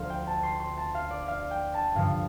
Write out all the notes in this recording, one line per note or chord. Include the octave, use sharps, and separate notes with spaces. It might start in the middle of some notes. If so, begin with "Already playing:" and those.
Already playing: D2 D3 F3 C5 F5
G5
A5
C6
C6
A5
F5
D5
F5
G5
A5
G2 D3 F3 F5